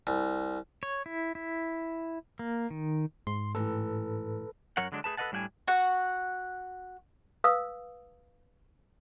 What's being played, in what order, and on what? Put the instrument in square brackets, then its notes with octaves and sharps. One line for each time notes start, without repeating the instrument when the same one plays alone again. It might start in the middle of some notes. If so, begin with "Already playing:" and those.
[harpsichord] C2
[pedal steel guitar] C#5
E4
E4
A#3
D#3
[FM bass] G#2 [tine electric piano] C6
[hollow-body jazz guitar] A2 E3 [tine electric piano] A4 B4
[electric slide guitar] F#2 F#3 A#4 C#5 F#5
D3 F#3 G#3 D4
A3 G#4 B4 A5
A4 B4 D5 D#5 F#5 A5
A2 G3 D4 F#5 G#5
[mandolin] F#4 F#5
[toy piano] B4 F5 D#6 E6